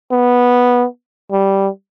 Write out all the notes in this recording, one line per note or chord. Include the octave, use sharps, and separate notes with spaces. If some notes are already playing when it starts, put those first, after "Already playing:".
B3
G3